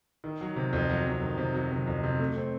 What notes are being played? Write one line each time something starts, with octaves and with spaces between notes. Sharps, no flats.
D#3
F#3
C3
F2
F#3
F2
D#3
C3
F#3
C3
F2
C3
A3
C4